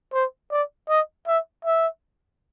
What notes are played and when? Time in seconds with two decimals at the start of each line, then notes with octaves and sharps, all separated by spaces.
0.13 C5
0.51 D5
0.89 D#5
1.27 E5
1.65 E5